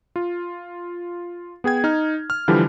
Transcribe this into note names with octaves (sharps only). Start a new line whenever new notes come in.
F4
B3 G#4 G5 G#6
D#4 F6
F6
D3 E3 F3 G3